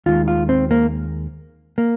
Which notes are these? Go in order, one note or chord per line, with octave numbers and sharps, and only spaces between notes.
D#2 D#3 G#3 F4
F4
C4
A#3
A#3